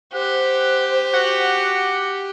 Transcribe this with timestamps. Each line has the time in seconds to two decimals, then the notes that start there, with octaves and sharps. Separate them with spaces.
0.14 G4 C5 F#5
1.13 F#4 F#5